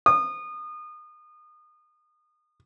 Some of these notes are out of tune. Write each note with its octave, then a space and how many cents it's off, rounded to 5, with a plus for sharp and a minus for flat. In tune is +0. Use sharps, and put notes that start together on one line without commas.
D#6 -30